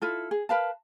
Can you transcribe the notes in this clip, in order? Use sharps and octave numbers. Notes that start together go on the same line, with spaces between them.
E4 F4 A4
G#4
A#4 B4 F5 A5